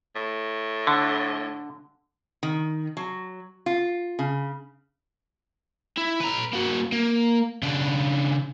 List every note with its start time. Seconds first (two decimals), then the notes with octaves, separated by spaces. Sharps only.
0.16 A2
0.87 D3
2.43 D#3
2.97 F#3
3.66 F4
4.19 C#3
5.98 E4
6.21 B4 A#5
6.53 A#3 F#4
6.92 A#3
7.63 C#3 D4